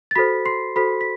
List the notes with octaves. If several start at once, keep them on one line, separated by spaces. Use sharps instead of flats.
A6
F#4 A4 C5 B5 B6
C6 C7
F#4 A4 C5 B5 B6
B6